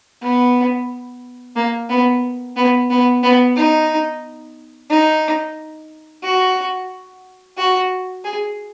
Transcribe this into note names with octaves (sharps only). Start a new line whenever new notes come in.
B3
A#3
B3
B3
B3
B3
D#4
D#4
F#4
F#4
G#4